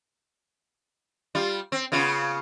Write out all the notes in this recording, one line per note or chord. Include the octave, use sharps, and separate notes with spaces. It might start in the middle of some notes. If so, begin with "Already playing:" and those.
G3 F4
C4
C#3 B3 F4